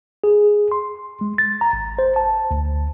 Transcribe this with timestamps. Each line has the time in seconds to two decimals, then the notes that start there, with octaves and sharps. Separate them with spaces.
0.24 G#4
0.72 C6
1.21 G#3
1.38 A6
1.61 A#5
1.73 G#1
1.99 C5
2.16 A5
2.51 D2